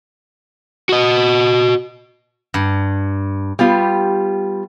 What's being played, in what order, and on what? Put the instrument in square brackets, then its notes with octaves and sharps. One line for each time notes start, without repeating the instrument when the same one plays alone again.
[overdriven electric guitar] F#4 D#5
[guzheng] G2
[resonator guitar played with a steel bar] G3 B3 F4 G4